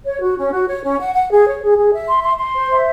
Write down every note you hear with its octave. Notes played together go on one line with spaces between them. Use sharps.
C#5
F#4
C#4
F#4
C#5
C#4
F#5
F#5
G#4
C#5
G#4
G#4
E5
C6
C6
C6
C5
E5